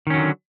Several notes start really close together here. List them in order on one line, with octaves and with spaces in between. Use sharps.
D#3 C#4 F#3 D3